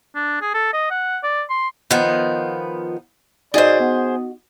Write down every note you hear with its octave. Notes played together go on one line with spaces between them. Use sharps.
D4
G#4
A4
D#5
F#5
D5
C6
D#3 F3 B3
D#4 F#4 G#4 C5 D5 D#5
B3